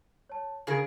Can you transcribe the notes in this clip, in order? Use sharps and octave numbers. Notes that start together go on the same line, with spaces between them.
C#5 A5
C#3 G#4 A#4 F5 G#6 D7